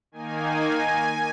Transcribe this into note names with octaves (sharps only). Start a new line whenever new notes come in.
D#3 A#3 D#4 G#5